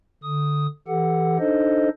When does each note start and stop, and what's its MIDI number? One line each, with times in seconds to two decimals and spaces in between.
0.23 0.67 50
0.23 0.67 87
0.88 1.38 52
0.88 1.38 67
0.88 1.38 69
0.88 1.38 78
1.39 1.89 62
1.39 1.89 63
1.39 1.89 69
1.39 1.89 72
1.39 1.89 75